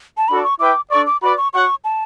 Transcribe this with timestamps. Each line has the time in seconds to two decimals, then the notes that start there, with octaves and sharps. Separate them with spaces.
0.17 A5
0.28 D4 F#4 A4 D5 B5
0.44 C#6
0.59 E4 B4 E5 G5 D6
0.91 D4 A4 D5 C#6
1.06 D6
1.22 F#4 B4 D5 B5
1.37 C#6
1.53 F#4 C#5 F#5 C#6
1.84 A5